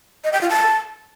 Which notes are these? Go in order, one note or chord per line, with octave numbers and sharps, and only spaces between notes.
D#5
G5
F4
A5